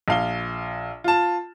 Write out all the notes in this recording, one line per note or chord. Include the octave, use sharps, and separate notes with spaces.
A#1 F5 G7
F4 A5